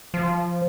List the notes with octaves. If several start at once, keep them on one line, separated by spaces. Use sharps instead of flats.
F3